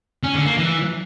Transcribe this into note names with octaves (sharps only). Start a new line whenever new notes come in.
C#4
D3
A#3
E3